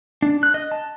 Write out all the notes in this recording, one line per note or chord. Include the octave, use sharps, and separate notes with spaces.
D4
F#6
D#5
A5